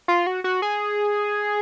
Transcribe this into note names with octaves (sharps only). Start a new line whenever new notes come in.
F4
F#4
F#4
G#4